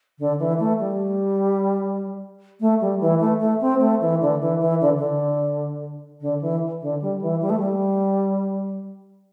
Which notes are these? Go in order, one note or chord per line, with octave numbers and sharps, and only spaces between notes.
D3
E3
A3
G3
A3
G3
E3
A3
A3
C4
A3
E3
D3
E3
E3
D3
D3
D3
E3
D3
G3
E3
G3
A3
G3